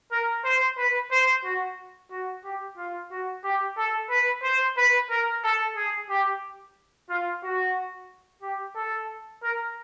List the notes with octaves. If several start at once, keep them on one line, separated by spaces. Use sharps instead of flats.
A#4
C5
B4
C5
F#4
F#4
G4
F4
F#4
G4
A4
B4
C5
B4
A#4
A4
G#4
G4
F4
F#4
G4
A4
A#4